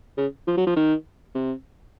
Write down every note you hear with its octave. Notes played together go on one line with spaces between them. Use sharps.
C#3
F3
F#3
F3
D#3
C3